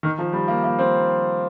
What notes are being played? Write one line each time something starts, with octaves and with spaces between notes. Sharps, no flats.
D#3
F3
G3
A#3
A#3
C4